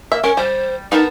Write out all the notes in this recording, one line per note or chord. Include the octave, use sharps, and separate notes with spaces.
A#3 E5
C#4 A#4
G3 C5
B3 D#4 A#4 A5